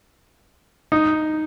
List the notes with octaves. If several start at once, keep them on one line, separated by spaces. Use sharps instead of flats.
D#4